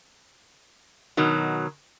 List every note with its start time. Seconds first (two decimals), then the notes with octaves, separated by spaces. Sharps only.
1.17 B2 D#3 F#3